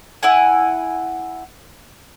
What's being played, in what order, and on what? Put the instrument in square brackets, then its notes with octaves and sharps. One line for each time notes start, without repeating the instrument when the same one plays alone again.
[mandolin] E4 F#5 G#5